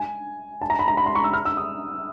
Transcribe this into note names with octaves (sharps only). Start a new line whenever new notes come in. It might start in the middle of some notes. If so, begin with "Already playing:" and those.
Already playing: G#5
A5
A#5
B5
A#5
B5
C6
C#6
E6
F6
E6
D#6